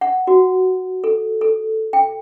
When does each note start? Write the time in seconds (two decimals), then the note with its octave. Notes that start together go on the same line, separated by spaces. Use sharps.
0.01 F#5
0.27 F#4
1.04 A4
1.41 A4
1.93 G5